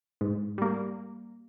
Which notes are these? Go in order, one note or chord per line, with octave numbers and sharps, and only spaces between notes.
G#2
G3 A#3